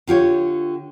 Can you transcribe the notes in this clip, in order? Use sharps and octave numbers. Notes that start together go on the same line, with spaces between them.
D3 F4 G4 C#5